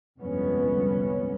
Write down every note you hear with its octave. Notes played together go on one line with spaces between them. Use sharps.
G1 C2 F2 G#3 B3 C#4